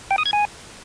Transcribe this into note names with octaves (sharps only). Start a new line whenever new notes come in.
G5
D#6
G#6
G#5